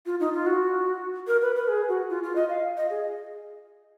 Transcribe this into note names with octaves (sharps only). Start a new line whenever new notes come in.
F4
D#4
F4
F#4
A#4
B4
B4
G#4
F#4
F4
F4
D#5
F5
D#5
G#4